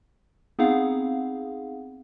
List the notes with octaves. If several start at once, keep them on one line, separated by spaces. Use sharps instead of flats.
B3 C4 D#4 G#4 F5 F#5